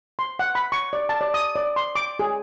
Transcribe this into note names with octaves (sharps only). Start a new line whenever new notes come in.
C6
F#5
B5
C#6
D5
A5
D5
D#6
D5
C6
D6
G#4